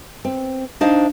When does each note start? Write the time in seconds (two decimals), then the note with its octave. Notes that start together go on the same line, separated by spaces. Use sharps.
0.25 C4
0.81 D4 D#4 C5 F5